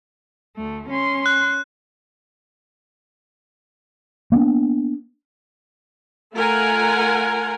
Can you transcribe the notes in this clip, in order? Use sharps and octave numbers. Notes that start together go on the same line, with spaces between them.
D2 A3
C#4 C6
F#6
A#3 B3 C#4 D4
A3 F4 A#4 F#5 G#5